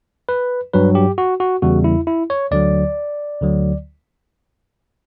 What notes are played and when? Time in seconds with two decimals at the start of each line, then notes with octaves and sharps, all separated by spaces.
0.29 B4
0.73 G2 F#3 B4
0.95 G4
1.18 F#4
1.40 F#4
1.62 E2 C#3 G3 F#4
1.84 E4
2.07 E4
2.30 C#5
2.51 D2 D3 F#3 D5
3.41 D2 D3 F#3